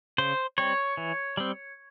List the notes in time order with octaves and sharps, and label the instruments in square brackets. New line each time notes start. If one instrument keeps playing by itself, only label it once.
[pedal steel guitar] C#3 C5
G3 C4 C#5
E3
G3 C4